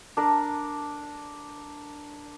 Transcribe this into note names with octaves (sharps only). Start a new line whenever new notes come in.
D4 A#4